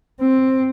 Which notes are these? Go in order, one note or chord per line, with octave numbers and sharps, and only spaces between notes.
C4